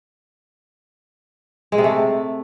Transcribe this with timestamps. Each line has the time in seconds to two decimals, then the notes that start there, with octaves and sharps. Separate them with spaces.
1.72 G#3
1.78 C3
1.84 A3